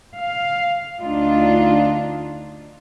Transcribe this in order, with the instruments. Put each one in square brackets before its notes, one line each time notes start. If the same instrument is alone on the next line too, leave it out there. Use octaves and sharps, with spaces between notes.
[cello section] F5
D2 D4 D#4 F4